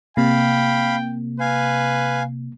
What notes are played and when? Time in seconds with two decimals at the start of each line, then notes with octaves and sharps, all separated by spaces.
0.17 C3 A#3 F5 G5 B5
1.40 B4 F5 G#5